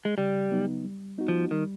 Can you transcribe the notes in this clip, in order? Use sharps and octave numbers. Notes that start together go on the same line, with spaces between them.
G#3
C#3 G3
F#3 B3 D#4
G3
B3 D#4 F#4
F3
D#3 G3